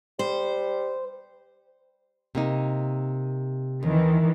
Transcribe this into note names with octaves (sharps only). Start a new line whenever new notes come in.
G3 C5
C3 A#3 D#4
D#2 D#3 E3